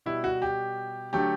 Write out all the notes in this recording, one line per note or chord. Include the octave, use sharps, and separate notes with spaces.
B2 G3 E4
F#4
G4
D3 F#3 A3 G4